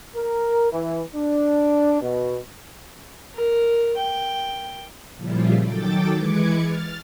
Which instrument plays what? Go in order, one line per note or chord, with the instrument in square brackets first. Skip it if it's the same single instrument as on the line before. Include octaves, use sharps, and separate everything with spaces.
[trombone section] A#4
E3
D4
B2
[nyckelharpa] A#4
G5
[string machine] A#2 C#3 F3 G3 E4 F4
D#3 F#3 A4 G5 D6 A6
E3 G#3 B4 D6 G#6 C#7
F6 A6